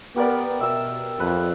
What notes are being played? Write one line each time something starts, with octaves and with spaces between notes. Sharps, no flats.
B3 G4 A#4 D5
B2 E5 E6
F2 B4